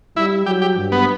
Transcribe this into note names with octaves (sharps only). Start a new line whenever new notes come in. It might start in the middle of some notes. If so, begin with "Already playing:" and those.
G3 E4
F#3 G4
G4
G2
B3